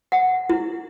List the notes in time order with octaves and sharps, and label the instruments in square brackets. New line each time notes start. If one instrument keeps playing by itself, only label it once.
[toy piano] F#5
E4